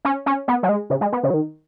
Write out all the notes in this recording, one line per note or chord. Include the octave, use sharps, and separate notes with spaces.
C#4
C#4
B3
F#3
G#3
C#3
G#3
B3
C#3
F#3
D#3